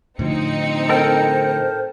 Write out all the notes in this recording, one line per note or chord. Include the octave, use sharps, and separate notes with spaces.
A2 D3 F3 C4 D#4 C#7
A4 A#4 C5 G5